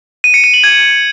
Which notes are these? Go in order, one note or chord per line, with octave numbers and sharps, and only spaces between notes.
D#7
C#7
D#7
F#7
G#6